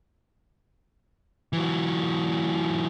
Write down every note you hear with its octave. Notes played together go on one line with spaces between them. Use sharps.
E3 F#3